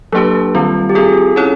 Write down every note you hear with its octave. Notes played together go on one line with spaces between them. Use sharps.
F#3 A#3 D4 G4 A4 B4
D#3 G3 C4 F4
G4
C4 F4 G#4 A4
C#4 E4 A4 C#5